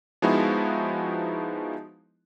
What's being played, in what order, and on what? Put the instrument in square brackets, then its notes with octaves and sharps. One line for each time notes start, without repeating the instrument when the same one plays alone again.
[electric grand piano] F3 G#3 B3 D#4 E4 F#4